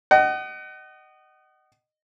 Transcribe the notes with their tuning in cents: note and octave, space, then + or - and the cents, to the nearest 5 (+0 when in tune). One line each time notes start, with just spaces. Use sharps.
D#5 -20 F#5 +35